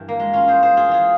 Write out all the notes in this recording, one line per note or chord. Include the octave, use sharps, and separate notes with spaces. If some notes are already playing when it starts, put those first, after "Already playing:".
Already playing: G2 E3 A#4
A#3
G#3
C#4 F4
G#4 C5
G#4 C5
F4 G#4
E3 F4 G#4